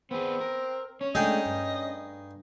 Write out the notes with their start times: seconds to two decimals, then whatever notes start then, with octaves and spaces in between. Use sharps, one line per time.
0.11 B3 C4 G#4
0.41 A#4
1.01 C#4 C#5
1.15 G#3 A3 D4 D#4 G#4 D#5 G5
1.46 G2